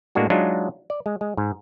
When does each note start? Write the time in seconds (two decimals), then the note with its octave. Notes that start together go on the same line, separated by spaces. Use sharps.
0.15 A2 G#3 A#3 D4 F#4
0.30 F#3 G#3 D4 D#4 F4
0.90 D5
1.06 G#3
1.21 G#3
1.37 G#2